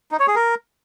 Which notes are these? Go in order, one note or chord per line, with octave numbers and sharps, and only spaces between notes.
D#4
C#5
G#4
A#4